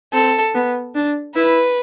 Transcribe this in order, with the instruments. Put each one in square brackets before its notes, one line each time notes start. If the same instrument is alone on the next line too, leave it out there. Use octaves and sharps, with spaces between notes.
[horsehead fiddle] C4 [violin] A4
[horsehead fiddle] B3
D4
[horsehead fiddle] E4 [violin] B4